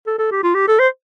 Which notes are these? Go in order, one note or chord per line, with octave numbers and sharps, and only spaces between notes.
A4
A4
G4
F4
G4
A4
C5